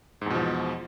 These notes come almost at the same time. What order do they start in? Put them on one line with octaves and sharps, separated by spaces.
G#2 E2 B2 F3